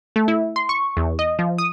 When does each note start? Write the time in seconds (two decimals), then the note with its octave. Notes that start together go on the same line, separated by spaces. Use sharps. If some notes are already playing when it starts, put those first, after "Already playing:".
0.16 A3
0.28 E4
0.56 C6
0.69 C#6
0.97 E2
1.19 D#5
1.39 F3
1.58 D#6